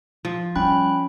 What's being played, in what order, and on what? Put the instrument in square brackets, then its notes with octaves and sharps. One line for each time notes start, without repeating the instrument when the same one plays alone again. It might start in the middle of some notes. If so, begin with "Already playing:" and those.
[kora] F3
[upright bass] G3 [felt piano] C#4 [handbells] G5 B5 F#6